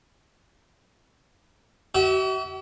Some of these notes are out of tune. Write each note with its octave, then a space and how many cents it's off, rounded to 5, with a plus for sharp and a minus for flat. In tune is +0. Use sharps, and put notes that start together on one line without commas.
F#4 +45 E5 -25